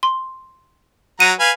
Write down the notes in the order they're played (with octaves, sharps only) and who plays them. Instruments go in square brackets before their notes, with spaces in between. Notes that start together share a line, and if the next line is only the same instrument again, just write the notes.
[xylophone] C6
[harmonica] F#3 F#5 A#5 [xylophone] D#7
[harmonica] B4 F5 G#5